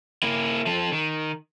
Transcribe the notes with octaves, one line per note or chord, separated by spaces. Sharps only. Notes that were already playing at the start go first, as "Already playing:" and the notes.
A#3 E4
F3 A4
D#3